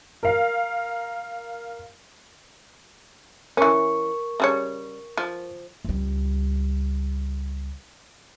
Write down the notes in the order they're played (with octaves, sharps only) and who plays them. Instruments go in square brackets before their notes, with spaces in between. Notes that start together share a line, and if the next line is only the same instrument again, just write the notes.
[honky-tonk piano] A#4 F5
[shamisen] E3 C#4 [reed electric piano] A#4 C#6
[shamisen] C#3 G3 C#5
F3
[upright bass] C#2 G3